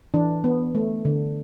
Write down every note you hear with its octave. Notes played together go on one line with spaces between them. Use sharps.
E3 D4
B3
A3
D3